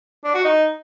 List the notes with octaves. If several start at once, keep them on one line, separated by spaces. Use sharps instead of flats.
D4
F#4
D#4